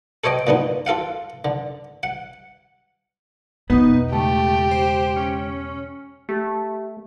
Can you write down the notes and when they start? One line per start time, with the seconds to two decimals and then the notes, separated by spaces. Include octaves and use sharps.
0.24 A4 C5 C#5 D#5 G5
0.47 A#2 D3 B3 D#4
0.86 F4 A4 F5 F#5
1.45 D3
2.03 F#5
3.70 E2 B2 B3 D#4
4.12 C#2 A3 G4
4.71 C5
5.16 C#4
6.29 A3 G4